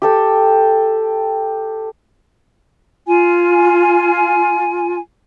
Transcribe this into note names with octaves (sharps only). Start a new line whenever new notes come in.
G4 A4 G5
F4 G#5